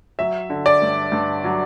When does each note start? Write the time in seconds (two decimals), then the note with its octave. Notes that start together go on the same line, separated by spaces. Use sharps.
0.19 F#3 E5
0.50 D3
0.66 D5
0.82 G2
1.12 G2
1.44 F#3